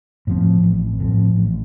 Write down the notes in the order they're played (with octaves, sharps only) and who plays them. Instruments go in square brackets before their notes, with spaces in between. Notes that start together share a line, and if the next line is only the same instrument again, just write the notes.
[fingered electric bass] A2 F3 C4
A1
A2 F3 C4
A1